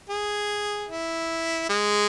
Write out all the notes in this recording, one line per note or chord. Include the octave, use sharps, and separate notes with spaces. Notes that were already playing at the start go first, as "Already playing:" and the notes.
G#4
E4
G#3